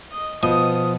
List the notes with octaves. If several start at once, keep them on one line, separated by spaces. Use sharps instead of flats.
D#5
B2 F3 D#5 D#6